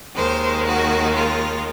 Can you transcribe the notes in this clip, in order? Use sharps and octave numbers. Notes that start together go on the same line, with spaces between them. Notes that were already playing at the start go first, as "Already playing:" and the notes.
D#2 D#3 G#3 C5
F#4
F4